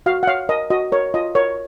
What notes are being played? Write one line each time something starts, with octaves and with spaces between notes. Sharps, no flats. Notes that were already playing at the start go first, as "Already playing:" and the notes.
F#4 F5
F#5
C#5 F5
A#4 D#5
F#4 D#5
A#4 C#5
F4 D#5
A#4 C#5